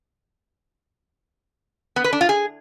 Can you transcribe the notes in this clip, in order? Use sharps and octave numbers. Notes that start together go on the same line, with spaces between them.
B3
B4
D4
F4
G#4